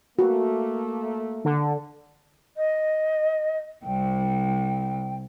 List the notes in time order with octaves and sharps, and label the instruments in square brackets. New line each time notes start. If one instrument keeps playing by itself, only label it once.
[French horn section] A3 A#3 [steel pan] F#4
[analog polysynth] D3
[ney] D#5
[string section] C2 [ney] G5